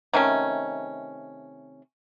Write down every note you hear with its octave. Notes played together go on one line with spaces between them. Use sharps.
C3 D#3 A3 C#4